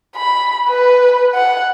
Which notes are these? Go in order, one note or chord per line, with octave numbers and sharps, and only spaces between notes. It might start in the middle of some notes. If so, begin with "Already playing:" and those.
B5
B4
F#5